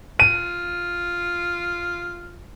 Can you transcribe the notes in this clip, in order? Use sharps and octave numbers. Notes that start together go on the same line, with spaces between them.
F4 D#7